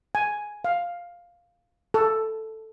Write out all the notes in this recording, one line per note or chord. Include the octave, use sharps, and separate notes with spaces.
G#5
F5
A4